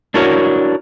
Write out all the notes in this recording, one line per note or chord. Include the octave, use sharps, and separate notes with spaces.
D4 E4 F#4 A#4 C#5